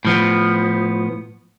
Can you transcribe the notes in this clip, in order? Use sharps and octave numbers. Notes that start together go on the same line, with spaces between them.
A2 F3 B3